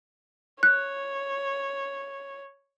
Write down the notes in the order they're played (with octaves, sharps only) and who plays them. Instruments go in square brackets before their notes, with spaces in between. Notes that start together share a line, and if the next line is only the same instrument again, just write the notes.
[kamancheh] C#5 [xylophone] F#6